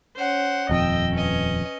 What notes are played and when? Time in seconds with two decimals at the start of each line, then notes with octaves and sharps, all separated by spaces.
0.16 C#4 C5 F#5
0.69 D#1 F2 D#5 G5 E6
1.12 C#4 B4 D#5